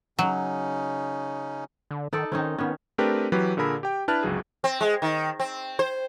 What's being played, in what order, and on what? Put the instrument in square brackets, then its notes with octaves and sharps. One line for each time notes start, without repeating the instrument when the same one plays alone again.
[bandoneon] C#3 C#4 D#4 [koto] F#3
[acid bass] D3
[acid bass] D#3 [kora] D#4 A4 D5
[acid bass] D#3 [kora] C4 C#4 D#4
[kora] D#3 C#4 [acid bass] B3
[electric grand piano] A3 C4 D4 G4 A#4 B4
E3 F#3 G4 B4
A#2 D3 G#4 A#4 B5 E6
G4 G5
D4 E4 B4 A5 F6 F#6
G1 C#2 F#3 G#4
[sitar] C4
G#3
D#3
C4
C5